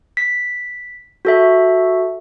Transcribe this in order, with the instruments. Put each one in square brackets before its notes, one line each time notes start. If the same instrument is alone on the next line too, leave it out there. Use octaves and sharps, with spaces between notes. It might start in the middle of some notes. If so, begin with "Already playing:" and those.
[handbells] B6
F#4 A4 E5